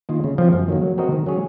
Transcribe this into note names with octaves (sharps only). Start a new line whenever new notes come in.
D#3 A#3 F4
C#3
F3 C4
F#2
D#3 F#3 A#3
F#3
C4 F#4 A#4 D#5
D#3
F#3 C#4 G#4 C#5